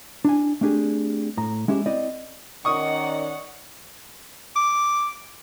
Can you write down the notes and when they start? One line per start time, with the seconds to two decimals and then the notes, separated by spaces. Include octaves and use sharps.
0.25 D4 E4 G#5
0.61 A3 C4 D4 G4 G#4
1.37 A2 A#5
1.68 G#3 C#4 E4 G4
1.86 C4 E4 D5 D#5
2.65 D#3 C#4 D5 D#5 F#5 C#6 D#6
4.56 D6